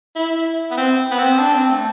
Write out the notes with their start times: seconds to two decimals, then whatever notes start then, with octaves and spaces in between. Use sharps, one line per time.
0.16 E4
0.71 B3
0.77 C4
1.11 B3
1.19 C4
1.38 D4
1.53 C4
1.70 A3